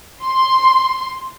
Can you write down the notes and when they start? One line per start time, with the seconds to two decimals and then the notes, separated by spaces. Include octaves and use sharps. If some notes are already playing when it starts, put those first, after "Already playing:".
0.24 C6